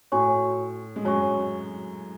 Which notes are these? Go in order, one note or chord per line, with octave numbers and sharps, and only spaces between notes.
A2 F#4 C#5 G#5 C#6
G#3
F#2 F#3 F#4 C#5 G#5 C#6